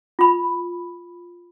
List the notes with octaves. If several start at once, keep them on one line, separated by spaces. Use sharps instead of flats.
F4 B5